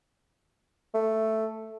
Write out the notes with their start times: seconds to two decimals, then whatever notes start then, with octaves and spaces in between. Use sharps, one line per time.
0.94 A3